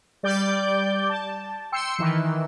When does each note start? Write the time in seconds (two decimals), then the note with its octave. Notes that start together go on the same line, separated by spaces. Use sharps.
0.23 G3 D5 D6 G6
1.09 A5
1.72 G5 C6 E6 C#7
1.99 D#3 E3